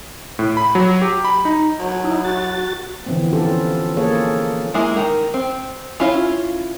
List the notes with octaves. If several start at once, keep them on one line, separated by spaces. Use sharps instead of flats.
A2
B5
F#3
G4
B5
D#4
F#3
D#4 E4
F#4 A6
D3 E3 F3 B3 C4
F3 C#4 D4 F4 G4 A4
A#3 G#4 A4 C#5
G#3 A#3 E4
D#3 A#4
C4
C#4 E4 F4 C#5